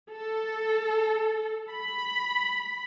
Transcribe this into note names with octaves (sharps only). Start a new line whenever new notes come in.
A4
B5